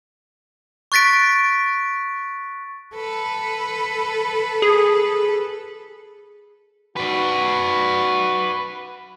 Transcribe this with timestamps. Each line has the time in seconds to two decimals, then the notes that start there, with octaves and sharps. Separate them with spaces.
0.92 C#6 F#6 A6 B6 D7
2.95 A4 B4
4.62 G#4
6.96 F#4 B4 D5